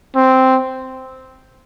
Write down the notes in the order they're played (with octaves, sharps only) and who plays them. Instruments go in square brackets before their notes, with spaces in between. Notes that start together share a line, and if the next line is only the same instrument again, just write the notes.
[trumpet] C4